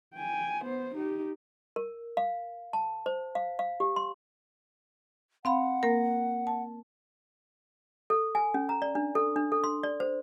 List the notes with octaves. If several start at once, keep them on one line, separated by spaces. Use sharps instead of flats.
G5 G#5
B3 C5
D#4 G4
A#4
F5
A5
C5
F5
F5
G4
C6
C4 F5 F#5 B5
A#3 A#4
A5
A4
G#5
C#4
A#5
D5
D4
A4
D4
A4
C6
D5
C5